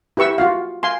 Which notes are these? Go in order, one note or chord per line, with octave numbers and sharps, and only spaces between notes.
E4 G4 B4 C#6 E6
F4 F#4 F5
F5 G#5 C6